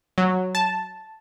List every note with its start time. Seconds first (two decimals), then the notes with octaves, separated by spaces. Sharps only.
0.18 F#3
0.55 A5